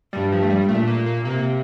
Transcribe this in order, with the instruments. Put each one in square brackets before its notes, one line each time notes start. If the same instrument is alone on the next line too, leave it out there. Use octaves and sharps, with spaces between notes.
[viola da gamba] G2 [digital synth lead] G3
[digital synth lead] F3
A3
G3
[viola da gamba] A#2 [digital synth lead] A3
[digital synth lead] A#3
A#3
[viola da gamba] C3 [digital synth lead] A#3